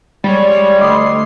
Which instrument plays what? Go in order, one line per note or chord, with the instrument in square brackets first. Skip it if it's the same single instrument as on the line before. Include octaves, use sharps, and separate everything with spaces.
[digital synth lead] G3 [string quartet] G#3 C#5
[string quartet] D2 C6 [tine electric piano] D#5 D6 D#6